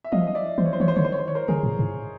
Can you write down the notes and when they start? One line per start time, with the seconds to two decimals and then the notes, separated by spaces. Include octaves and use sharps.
0.04 E5
0.12 F3 D#5 F5
0.27 D#5
0.35 D5 E5
0.58 E3 C5
0.66 C#5
0.73 C5
0.80 E3 C#5
0.88 C5
0.96 D3 C#5
1.03 D#3 C5
1.12 C#5
1.19 C5
1.28 C#5
1.35 A#4 C5
1.48 D3 G#4 A#4
1.63 A2
1.79 G#2